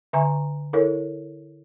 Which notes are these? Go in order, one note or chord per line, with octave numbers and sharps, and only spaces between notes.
D3 E5 G#5 A#5 C#6
E4 A4 A#4 C#5